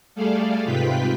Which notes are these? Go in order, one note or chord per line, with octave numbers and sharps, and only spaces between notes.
G3 A3 G#4 A4 D5 F5
G#2 C3 F4 B4 G5 B6